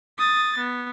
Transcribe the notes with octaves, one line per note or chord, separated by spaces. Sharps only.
D#6 A6
B3